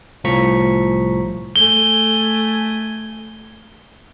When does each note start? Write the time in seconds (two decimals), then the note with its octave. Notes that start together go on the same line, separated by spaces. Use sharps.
0.24 C2 A2 F3 A#5 C#6 B6
1.56 A3 G#5 G7